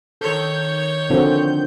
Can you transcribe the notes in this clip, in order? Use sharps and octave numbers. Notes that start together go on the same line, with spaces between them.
D#3 A4 C#5 G6
D3 F3 C4 F#4 A4